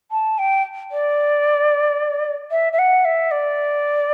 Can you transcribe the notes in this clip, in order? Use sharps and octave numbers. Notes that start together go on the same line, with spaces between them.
A5
G5
D5
E5
E5
F#5
E5
D5